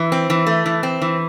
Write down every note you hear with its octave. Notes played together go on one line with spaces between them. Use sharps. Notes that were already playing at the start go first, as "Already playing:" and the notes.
Already playing: E3
C4
E3
A3
E3
C4
E3